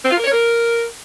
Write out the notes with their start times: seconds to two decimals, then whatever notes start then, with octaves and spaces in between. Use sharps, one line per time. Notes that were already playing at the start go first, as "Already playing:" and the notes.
0.04 C4
0.11 F4
0.17 A#4
0.24 C#5
0.30 A#4